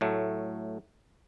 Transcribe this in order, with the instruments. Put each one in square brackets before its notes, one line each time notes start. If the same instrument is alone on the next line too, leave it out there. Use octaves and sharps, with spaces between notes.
[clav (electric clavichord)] A2 F#3 A3